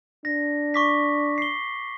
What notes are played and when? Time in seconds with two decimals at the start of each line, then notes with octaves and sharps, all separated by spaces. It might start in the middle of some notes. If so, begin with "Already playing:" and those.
0.25 D4 A#6
0.74 C#6 D6 B6
1.38 C7 G7